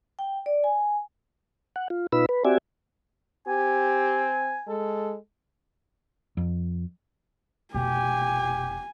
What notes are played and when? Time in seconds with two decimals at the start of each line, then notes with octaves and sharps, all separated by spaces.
0.19 G5
0.46 D5
0.64 G#5
1.76 F#5
1.90 F4
2.12 B2 D#4 F4 B4 B5 E6
2.29 B4
2.45 C4 F#4 G4 D5 E5 G#5
3.47 C4 G4 G#5
4.68 G#3 A4
6.37 F2
7.74 F1 B2 G4 G#5